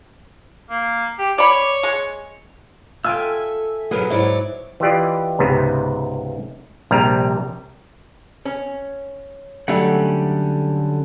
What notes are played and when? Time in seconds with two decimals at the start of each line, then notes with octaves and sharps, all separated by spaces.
0.70 A#3
1.19 G4
1.38 C#5 D5 B5
1.83 G#3
3.05 F4 A4 E5 G5 G#5 E6
3.91 F#2 B2 F#3 G#4 A#4 B4
4.10 G#2 F#3 E4 C#5 D5
4.80 E3 E4 F4 G4 D5 D#5
5.39 C#2 G#2 C3 B3
6.91 A#1 C3 G3 A#5
8.45 C#4
9.68 D3 F#3 G3 A3 C#4 F#5